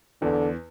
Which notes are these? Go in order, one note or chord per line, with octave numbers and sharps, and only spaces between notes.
E2 D3